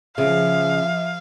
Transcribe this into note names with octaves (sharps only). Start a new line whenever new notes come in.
C#3 F3 E5 F5